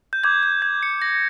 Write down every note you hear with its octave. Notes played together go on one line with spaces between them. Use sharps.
G6
D6 G6 G#6
G6
G#6
C#7
A#6